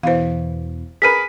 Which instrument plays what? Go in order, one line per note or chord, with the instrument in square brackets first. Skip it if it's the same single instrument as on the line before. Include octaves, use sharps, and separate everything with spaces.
[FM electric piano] E2 B2 E3 [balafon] C5 F5
[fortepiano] G#4 A#4 B4 [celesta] B6 D#7